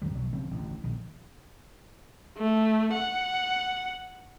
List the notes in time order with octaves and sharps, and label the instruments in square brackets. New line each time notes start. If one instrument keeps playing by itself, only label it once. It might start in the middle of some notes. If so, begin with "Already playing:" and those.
[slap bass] E2 G2 D#3 G3
B1 F#3
E1 C#3 F3 C4
A1 D2
A#1 D#3
[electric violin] A3
F#5